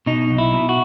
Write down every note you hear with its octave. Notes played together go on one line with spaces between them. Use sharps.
B2 D#4
B1
E4
B2
F#4